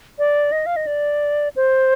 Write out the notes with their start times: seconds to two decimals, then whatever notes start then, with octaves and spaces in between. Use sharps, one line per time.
0.19 D5
0.52 D#5
0.66 F5
0.76 D#5
0.87 D5
1.56 C5